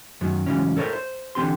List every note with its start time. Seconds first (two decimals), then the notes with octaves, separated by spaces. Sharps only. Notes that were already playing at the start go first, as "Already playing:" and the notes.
0.21 F#2 D#3 F#3
0.46 G#2 C#3 E3 F#3 C#4
0.77 A4 A#4 C5 C#5 D#5 E5
0.93 C5
1.35 D3 E3 C4 G4 C6